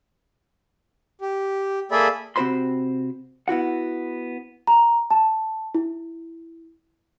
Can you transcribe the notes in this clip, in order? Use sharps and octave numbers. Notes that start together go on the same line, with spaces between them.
G4
A#3 G#4 A4 D5 E5 B5
C3 C4 F#4 C5 B5 C6
B3 E4 F#4 F#5
A#5
A5
E4